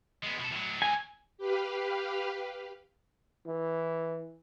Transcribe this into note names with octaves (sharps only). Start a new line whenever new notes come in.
G#3 B3
B2 A4
A2 F#3
G#5
G4 B4 F5
E3